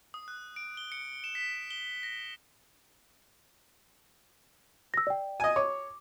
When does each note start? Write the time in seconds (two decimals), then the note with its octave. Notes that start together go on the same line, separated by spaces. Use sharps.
0.14 D#6
0.28 F#6
0.56 D7
0.77 G7
0.92 C#7
1.24 E7
1.35 B6
1.71 G7
2.03 A#6
4.94 E6 A#6
5.07 D5 G5
5.40 D#5 G#5
5.56 C#5 D6